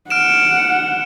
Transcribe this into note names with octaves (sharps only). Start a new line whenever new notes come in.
F#5 F6 D7 E7